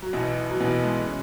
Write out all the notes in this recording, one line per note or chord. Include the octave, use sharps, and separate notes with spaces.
F#3
B1 B2 E3 B3 E4
F#3
B1 B2 E3 B3 E4
G#3
C#4